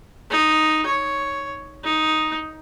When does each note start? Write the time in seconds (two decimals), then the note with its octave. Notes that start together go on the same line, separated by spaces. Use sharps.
0.31 D#4
0.86 C#5
1.84 D#4